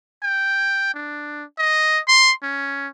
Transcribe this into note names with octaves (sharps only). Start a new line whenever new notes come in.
G5
D4
D#5
C6
C#4